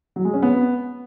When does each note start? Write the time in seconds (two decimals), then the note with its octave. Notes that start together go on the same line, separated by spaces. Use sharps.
0.16 F#3
0.25 G#3
0.34 C#4
0.43 B3